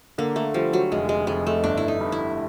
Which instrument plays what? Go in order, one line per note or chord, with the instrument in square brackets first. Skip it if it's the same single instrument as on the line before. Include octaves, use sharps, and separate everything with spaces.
[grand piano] D3 [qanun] A#3
[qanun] A3
[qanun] F3 [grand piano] G3
[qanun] F#3
[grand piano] F1 [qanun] G#3
[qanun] G#3
[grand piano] F2 [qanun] G#3
[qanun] A3
[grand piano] G1 [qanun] D4
[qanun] E4
D#4
[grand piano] G2
[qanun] E4